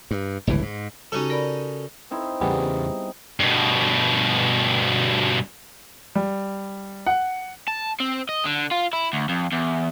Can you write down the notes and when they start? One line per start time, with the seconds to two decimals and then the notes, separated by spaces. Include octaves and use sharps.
0.11 G2
0.47 G1 C#2 A2 E3
0.62 G#2
1.12 C#3 C#4 D#4 F#4 G4 A4
1.30 A#4 D5 B5
2.11 C4 D#4 E4
2.41 E2 C#3 G3 B3 G#4
3.40 G2 B2
6.15 G3
7.06 F#5
7.68 A5
8.00 C4
8.29 D#5
8.45 D3
8.71 F4
8.93 E4
9.13 D2
9.29 F2
9.52 E2